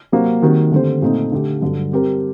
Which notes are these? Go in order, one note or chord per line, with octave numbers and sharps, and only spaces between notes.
C3 F#3 A#3 F#4 C5
D#3 G3 C4 F#4 A#4
D3 A3 C4 G4 C5
A#2 A3 C4 D#4
D3 A3 D4 G4
G2 D3 F#3
G3 C4 G4 A#4